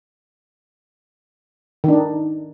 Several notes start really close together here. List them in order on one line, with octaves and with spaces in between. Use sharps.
D#3 D4 D#4